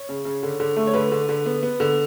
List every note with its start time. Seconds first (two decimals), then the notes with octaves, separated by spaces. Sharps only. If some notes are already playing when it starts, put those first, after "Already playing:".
Already playing: C#5
0.09 C#3
0.25 C#3
0.43 D3
0.60 D3
0.76 A3
0.87 C#5
0.93 D3 B4
1.12 D3
1.29 D3
1.46 B3
1.63 B3
1.80 D3